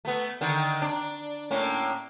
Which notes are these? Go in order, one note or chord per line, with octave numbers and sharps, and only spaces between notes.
A3 B3
D3 D#3
D4
A2 A#3 C#4